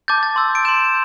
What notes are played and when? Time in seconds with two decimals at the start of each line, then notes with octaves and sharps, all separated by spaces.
0.08 A5 D6 G6 A6
0.23 A6
0.36 C6 E6 G6
0.55 D7
0.65 C6 G6 E7